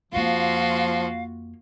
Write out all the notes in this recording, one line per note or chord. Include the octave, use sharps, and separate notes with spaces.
F2 F3 A#3 F4 F#4 F5